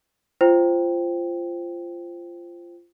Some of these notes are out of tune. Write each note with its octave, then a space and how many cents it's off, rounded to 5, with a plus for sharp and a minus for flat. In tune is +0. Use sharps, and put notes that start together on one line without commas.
F4 -20 C5 +0 G5 +0